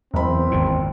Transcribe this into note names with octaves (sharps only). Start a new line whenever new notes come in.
F#1 E2 C4 B5
G#1 F2 A#2